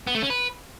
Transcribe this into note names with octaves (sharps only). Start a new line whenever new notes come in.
B3
A3
C#4
B4